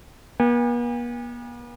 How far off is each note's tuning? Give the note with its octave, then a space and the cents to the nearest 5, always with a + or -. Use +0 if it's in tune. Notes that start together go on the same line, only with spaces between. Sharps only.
B3 -45 G#5 -45